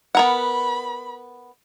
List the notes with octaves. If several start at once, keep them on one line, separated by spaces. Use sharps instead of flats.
B3 A#4 F#5 B5